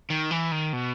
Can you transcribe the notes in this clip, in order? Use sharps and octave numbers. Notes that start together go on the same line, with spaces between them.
D#3
E3
D#3
B2